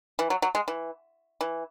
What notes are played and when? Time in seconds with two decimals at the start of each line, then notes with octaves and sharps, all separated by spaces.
0.19 E3
0.30 F#3
0.42 F#3
0.55 G#3
0.68 E3
1.41 E3